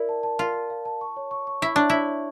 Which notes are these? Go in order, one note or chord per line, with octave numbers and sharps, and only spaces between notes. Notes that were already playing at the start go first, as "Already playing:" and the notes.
Already playing: E4 A#4 D5
A5
A5
F4 A#4
A#4
F5
A5
C#6
C#5
C#6
C#6
E4 C#6
D4 C#5
E4 C#5
C#5